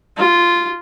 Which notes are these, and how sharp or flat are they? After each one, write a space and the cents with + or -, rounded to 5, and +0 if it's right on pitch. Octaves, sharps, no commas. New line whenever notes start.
F4 -10